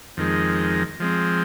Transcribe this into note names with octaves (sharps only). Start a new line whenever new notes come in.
F2 D#3 G#3
F3 G#3 C4